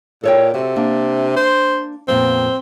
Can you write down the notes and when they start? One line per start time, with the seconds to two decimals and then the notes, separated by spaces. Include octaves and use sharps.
0.23 A#2 A4 C#5 G5
0.54 C3 F#4 A4
0.76 A#3 D4
1.36 C5
2.08 F2 A#2 B3 C4